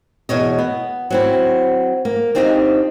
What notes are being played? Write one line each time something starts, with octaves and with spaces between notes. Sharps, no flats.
E2 B2 C#5 D#5
B3
F#3 C4 E4
A#3
C4 D4 D#4 F4 G4 D#5